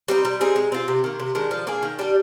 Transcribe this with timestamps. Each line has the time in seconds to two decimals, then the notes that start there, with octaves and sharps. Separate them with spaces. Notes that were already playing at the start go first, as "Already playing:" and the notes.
0.08 G3 C4 D#4
0.25 G3
0.41 C4 D#4 G#4
0.56 G#3
0.72 C4 F4
0.88 C3
1.04 D#3 A#3
1.20 C3
1.35 D#3 G#3 D4
1.51 F3
1.67 A#3 D4 G#4
1.83 D#3
1.99 G3 D4 G4